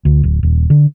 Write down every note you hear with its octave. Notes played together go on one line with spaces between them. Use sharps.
D2
D1
D#1
D3